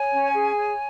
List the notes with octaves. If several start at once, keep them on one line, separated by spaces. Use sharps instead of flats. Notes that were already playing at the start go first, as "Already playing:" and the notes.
Already playing: C#5 G#5
C#4
G#4
C#5